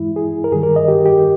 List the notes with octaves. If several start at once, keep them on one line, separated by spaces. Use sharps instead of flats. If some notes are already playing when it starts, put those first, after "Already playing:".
Already playing: G2 E3 G#3 E4
G#4
A#4
G2 D#3 G3 G#4
A#4
D#5
G4
G4